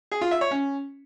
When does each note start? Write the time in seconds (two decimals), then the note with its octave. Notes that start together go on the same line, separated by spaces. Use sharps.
0.11 G#4
0.21 F4
0.31 E5
0.41 C#5
0.51 C#4